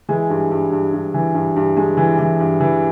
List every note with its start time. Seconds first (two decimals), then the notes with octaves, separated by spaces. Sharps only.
0.09 E3 G#3
0.30 G2
0.51 G2
0.72 G2
0.93 G2
1.14 E3
1.34 G2
1.56 G2
1.77 G2 G#3
1.97 E3
2.19 E3
2.40 G2
2.60 E3